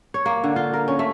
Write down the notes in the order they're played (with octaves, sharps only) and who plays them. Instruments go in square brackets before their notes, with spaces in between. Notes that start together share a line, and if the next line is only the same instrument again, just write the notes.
[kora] C#5
A#3
D3
F4
A#4
C#4
A3